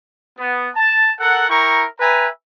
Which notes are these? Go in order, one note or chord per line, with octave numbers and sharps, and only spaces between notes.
B3
A5
A4 A#4 F#5
E4 A#4 G5 A#5 C#6
B4 E5 G5 G#5 A#5